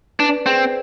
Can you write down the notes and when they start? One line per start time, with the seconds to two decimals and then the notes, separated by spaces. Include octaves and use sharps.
0.19 D4 B4 D5
0.46 C4 G#4 C5